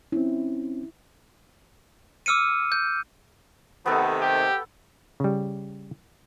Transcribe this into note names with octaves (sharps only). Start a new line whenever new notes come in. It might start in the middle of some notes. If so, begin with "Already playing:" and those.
C4 C#4 E4
D6 E6 F6 C#7 D#7
G6
C3 D#3 A3 B3 A4
G4
C#3 G3